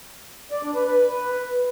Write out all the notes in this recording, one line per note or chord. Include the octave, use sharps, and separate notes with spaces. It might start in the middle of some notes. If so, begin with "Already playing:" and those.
D5
D4
B4
B4